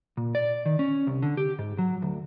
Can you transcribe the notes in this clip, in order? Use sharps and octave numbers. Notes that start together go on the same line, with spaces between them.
A#2
D5
D#3
C#4
C2
D3
G4
G#2
F#3
D2